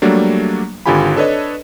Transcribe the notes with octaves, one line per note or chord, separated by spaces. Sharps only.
F#3 G3 A3 A#3 D4
G#1 D3 F4 G4 G#5 B5
D4 A4 B4 C#5 D#5